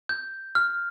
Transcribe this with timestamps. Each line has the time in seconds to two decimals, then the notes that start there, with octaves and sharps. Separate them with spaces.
0.09 G6
0.55 F6